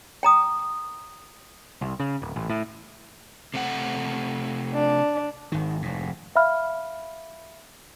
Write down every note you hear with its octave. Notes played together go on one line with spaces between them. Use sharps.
G5 A#5 D#6
C2
C#3
D1
A1
A2
C3 A3 F#5
D4
G#1 D#3
F1 G#2
E5 F5 B5 F6